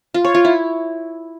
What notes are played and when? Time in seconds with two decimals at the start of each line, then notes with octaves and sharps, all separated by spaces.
0.14 F4
0.25 C#5
0.35 F4
0.45 E4